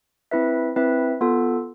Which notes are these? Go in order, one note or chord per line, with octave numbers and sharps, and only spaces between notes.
C4 E4 B4 E5
C4 E4 B4 E5
B3 F4 A4